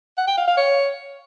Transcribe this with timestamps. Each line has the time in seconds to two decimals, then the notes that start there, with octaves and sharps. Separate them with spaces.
0.17 F#5
0.27 G5
0.37 F5
0.47 F5
0.57 C#5